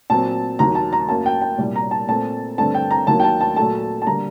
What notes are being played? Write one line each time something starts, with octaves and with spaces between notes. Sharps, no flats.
A#2 F#3 C4 A5
D#2 D#3 F#3 A#5
A5
A#5
F#2 F#3 A#3 A5
G5
G5
C2 A#2 G3
A#5
A5
A#2 A3 C4 A5
G2 D3 A3 C4 A5
G5
A#5
D#2 D#3 F#3 A#3 A5
G5
A5
A5
A#2 F#3 A3 A5
A5
D3 G3 A#3 A#5